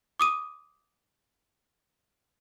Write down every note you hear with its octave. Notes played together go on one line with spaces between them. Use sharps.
D6 D#6 D#7